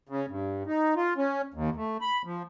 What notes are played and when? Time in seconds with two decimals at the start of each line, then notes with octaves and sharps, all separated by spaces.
0.09 C#3
0.28 G2
0.67 D#4
0.96 F4
1.17 C#4
1.54 D#2
1.76 A3
2.01 B5
2.25 F3